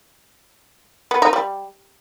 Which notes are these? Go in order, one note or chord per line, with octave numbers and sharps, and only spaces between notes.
B3
D#4
G3